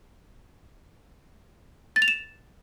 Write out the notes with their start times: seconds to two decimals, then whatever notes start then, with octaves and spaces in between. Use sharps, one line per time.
1.96 A6
2.02 F7
2.08 E7